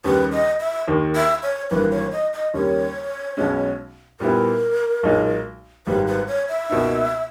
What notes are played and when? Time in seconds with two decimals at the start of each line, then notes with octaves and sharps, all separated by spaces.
0.04 D#2 C#3 G3 B4
0.32 D#5
0.60 E5
0.88 D#2 D#3 A#3
1.16 E5
1.43 C#5
1.70 G#1 G2 E3 A#3 B4
1.92 C#5
2.12 D#5
2.34 D#5
2.54 D#2 C#3 G3 A#3 C#5
3.37 B1 B2 G#3 C#4
4.20 A#2 G3 B3 E4 A#4
5.03 B1 A#2 G#3 D#4
5.87 G#1 G#2 G3 B4
6.07 B4
6.28 C#5
6.49 E5
6.70 C#2 B2 A#3 D#4